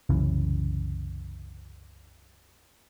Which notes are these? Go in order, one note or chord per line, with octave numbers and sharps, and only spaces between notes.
C2 F#2 C#3 E3